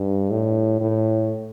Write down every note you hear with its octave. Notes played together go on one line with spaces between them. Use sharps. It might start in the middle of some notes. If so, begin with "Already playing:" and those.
Already playing: G2
A2
A2